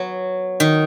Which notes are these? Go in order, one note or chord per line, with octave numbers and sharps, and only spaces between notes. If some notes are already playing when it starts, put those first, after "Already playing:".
Already playing: F#3 B3
D#3